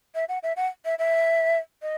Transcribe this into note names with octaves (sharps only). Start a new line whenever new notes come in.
E5
F#5
E5
F#5
E5
E5
D#5